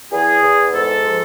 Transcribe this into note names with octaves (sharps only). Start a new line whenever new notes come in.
E2 G#4
E2
G#2 A4
F3